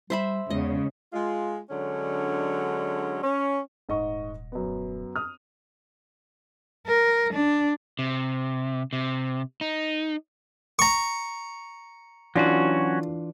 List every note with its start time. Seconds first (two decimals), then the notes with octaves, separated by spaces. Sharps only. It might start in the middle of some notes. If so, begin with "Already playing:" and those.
0.10 G3 C5 E5 B5
0.50 E2 C#3 G#3 D#5
1.13 G#3 F4
1.70 D3 F#3 G#3 C#4 D4
3.23 C#4
3.89 D#1 G#2 D#5 C#6
4.52 F#2 B3
5.16 D#6 F6
6.87 A#4
7.34 D4
7.99 C3
8.93 C3
9.61 D#4
10.79 A#5 C#6
12.36 E3 F#3 C#4 D4 F4 F#4